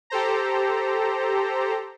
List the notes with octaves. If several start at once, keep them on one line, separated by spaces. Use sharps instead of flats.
G4 A4 C5 A#5